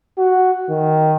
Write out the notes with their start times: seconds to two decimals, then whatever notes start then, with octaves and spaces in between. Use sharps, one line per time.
0.18 F#4
0.70 D#3